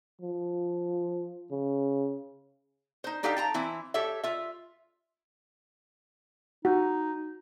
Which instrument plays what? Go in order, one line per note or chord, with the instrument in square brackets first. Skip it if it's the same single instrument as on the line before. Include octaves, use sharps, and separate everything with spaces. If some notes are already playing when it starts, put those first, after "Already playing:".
[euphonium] F3
C#3
[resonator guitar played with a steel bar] D#4 C5
D4 D#4 G4 A4 F5 G5
G5 A5 A#5
E3 C4 E4
G4 A4 C#5 E5
F4 E5
[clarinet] D#4 [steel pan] F#4